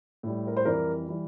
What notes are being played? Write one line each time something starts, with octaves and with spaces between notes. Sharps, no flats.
A2 G3
A#4
C5
F2 E3 G3 A#4 D5
E3 G3